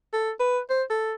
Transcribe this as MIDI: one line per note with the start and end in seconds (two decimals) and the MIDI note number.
0.13 0.31 69
0.40 0.60 71
0.70 0.83 72
0.90 1.14 69